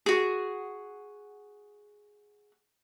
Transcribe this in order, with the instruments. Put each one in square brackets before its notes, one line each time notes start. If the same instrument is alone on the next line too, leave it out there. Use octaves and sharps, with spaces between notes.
[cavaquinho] F#4 G#4